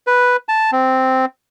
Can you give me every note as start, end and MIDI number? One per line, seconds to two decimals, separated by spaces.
0.07 0.36 71
0.49 0.71 81
0.72 1.25 60